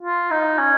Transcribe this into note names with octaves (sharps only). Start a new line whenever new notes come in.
F4
D#4
C#4